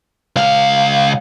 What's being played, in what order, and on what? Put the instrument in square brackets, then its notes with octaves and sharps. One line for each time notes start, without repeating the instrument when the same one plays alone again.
[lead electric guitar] C#2 F5